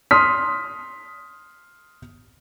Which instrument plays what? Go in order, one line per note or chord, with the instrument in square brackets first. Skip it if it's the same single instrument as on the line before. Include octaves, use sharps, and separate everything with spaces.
[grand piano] C6 D#6 F6 B6